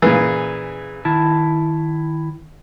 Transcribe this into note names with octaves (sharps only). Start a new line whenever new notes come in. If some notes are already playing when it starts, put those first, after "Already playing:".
A#2 C#3 E3 G#4
D#3 E4 A5